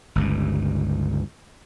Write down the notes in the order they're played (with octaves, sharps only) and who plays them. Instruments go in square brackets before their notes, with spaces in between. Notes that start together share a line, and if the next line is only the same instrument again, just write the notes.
[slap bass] G1 C#2 G2